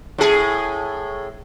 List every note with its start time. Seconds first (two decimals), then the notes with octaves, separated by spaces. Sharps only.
0.18 A2 G#4